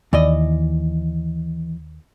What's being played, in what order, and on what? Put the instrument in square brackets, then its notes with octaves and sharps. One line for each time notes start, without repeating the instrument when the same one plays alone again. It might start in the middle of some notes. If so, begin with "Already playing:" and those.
[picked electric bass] D#2 [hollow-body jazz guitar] E3 D5 D#5